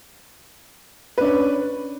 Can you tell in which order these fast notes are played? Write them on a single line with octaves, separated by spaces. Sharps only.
B4 D4 C#4